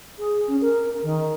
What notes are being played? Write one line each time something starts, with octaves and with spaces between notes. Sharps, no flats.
G#4
C#4
A#4
D#3